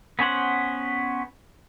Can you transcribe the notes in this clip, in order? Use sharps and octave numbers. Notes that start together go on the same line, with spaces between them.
B3 C#4 C5 F#5